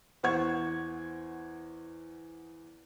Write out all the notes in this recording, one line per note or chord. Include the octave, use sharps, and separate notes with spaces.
E2 C5 F#5 C#6 G#6